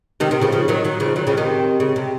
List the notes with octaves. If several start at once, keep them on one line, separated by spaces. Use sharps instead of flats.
C3 D#3
C3 D#3
C#3 F3
C#3 F3
D#3 F#3
D#3 F#3
C#3 F3
D#3 F#3
C#3 F3
C3 D#3
C#3
C3